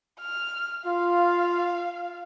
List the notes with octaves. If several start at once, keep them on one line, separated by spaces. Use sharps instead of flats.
F6
F4 F5